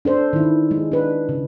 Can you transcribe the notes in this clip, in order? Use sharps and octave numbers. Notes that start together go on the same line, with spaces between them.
D4 A4 C5
D#3 E4
G#3
D4 B4
C#3